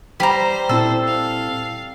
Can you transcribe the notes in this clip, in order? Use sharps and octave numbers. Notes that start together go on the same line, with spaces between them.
G3 C5 A#5 B5
A#2 C4 E4 A4
F5